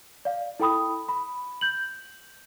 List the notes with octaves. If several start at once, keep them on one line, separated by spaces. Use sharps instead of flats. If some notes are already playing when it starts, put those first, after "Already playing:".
D5 F5
E4 A4 G5 B5 D#6
B5
G6 F#7